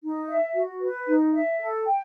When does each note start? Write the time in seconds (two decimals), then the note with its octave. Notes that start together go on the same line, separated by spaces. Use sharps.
0.03 D#4
0.28 E5
0.55 F#4
0.81 B4
1.08 D#4
1.33 E5
1.60 A4
1.86 G5